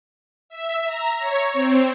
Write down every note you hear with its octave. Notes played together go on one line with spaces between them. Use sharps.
E5
A#5
C#5
C4